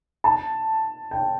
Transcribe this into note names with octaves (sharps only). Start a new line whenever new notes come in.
A5
G5